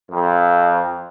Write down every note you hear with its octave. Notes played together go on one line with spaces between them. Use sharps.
F2